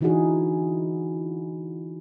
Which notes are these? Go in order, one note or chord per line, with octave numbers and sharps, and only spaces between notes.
D3 E3 D#4 E4 F#4 G#4